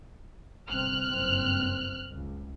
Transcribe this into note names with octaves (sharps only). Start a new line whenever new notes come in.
G1 C3 C4 F6 F#6
F#1 G2 C4
C#2